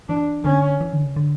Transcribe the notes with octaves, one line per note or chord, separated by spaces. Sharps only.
E3 D4
D3 C#4
E3
D3
C#3
D3